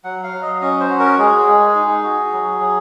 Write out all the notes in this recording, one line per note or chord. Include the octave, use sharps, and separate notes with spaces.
F#3 F#5
F5
F#3
D#5
C#4 D#5
C5
F#4
A#4
G#3 G#4
G#3
D#4
F#4
F#3
F#3